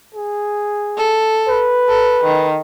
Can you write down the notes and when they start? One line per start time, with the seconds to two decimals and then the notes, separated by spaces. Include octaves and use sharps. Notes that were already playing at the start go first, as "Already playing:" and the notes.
0.15 G#4
0.98 A4
1.48 B4
1.89 A4
2.24 D#3